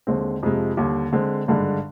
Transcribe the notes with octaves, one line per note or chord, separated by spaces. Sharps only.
D#2 D3 G#3 C4
F2 C3 F3 G#3
D#2 D3 G3
D3 G#3 C4
G#1 G2 D3 G#3 D4